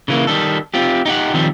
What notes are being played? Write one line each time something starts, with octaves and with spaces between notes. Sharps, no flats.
C#3 E3 A#3
D#3 G3 A4
C4 F4 G4
D#4 G4 F#5
D#3 F3 G3 C4